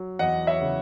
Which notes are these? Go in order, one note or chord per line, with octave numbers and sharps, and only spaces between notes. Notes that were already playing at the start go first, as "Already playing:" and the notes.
Already playing: F#3
E2 D#5 F#5
C#5 E5
C#3